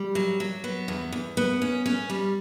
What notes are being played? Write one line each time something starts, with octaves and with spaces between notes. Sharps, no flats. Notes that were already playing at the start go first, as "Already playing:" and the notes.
Already playing: G3
F#3
F#3
B3
E2
E2
B3
C#4
C#4
G3